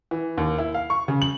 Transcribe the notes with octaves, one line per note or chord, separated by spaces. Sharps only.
E3
D#2
E4
F5
C#6
C#3
F#7